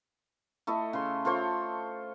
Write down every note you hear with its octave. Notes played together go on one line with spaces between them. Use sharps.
A3 E4 A4 D#5
C#3 C6
F4 A4 C5 C#5